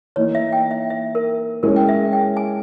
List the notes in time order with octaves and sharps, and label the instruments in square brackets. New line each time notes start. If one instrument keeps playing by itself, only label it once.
[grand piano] E3 A#3 D#4 [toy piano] C#5
[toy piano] E5
G5
E5
E5
A#4
[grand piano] G#3 C#4 E4 G#4 C#5 [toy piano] A#4
[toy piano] G5
E5
G5
G#5